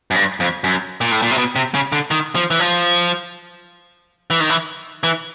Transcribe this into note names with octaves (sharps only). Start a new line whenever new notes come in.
F#2
G2
F2
F#2
A#2
A2
A#2
C3
B2
C3
C#3
D3
D#3
F3
E3
F3
E3
D#3
E3
E3